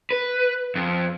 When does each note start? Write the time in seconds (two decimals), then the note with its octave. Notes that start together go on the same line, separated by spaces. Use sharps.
0.11 B4
0.75 F2